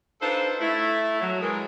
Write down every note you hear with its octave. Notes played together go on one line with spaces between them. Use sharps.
D4 D#4 F4 A4 B4 C5
A3 E4
F#3
E3 G#3 A#4